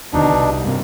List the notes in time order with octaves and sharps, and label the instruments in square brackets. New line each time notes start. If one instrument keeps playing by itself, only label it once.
[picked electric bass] E1 D#2 D3 [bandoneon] B2 D4 D#4
[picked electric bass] C2
[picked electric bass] G2 C3 [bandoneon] A#3